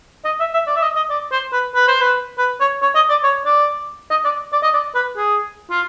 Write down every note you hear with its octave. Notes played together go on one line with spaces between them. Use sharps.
D#5
E5
E5
D5
E5
D#5
D#5
D5
C5
B4
B4
C5
B4
B4
C#5
C#5
D#5
D5
C#5
D5
D#5
D5
D5
D#5
D5
B4
G#4
F4